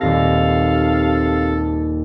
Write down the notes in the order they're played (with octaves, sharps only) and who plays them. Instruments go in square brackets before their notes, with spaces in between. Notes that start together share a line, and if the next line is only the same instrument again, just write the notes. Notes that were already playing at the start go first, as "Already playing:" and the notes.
[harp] D#1 D#2 A#6 [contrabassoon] C3 [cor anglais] A4 [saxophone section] F5